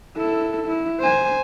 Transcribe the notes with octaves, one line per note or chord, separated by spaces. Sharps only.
E4 A4
E4
C5 G#5